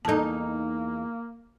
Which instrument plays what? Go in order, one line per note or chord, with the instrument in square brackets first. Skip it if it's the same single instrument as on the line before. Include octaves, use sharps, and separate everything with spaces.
[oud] E2 D#4 [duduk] A#3 [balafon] A4 A5